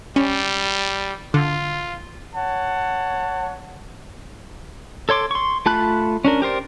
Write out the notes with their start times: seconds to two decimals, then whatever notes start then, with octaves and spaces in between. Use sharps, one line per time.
0.16 G3 C#4
1.34 D3 F4
2.34 C#5 F#5 A5
5.09 A4 C#5 C6 D6
5.31 C6 C#6
5.66 A3 F4 A5 B5 F#6
6.25 C#4 D4 A#4
6.42 G4 A#4 C5 D5